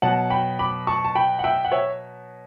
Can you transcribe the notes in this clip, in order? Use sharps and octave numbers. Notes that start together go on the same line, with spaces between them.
B2 F#3 F#5 A5
G5 B5
B5 D6
A5 C#6
A5
G5 B5
F#5
E5 G5
F#5
C#5 E5